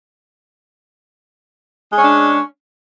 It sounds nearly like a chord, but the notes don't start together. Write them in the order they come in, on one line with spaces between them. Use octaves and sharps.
G#3 C#4 D4